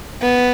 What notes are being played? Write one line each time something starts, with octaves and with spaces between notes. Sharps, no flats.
B3